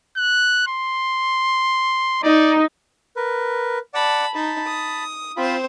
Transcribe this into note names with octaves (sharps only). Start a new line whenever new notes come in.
F#6
C6
D#4 D5
A#4 B4
D5 F#5 A5 B5 D6
D#4 A5 B5
D#6
C4 F4 C5 B5